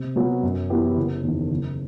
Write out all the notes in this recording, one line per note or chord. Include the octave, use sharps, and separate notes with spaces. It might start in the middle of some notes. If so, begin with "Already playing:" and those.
Already playing: C3
F#3 B3 F#4
F#2
E3 B3 E4 G4
F#1
E2 D#3
F#1